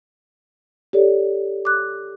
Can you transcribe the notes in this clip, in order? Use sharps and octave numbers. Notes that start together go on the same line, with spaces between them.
G4 A4 C#5 D5
D6 F#6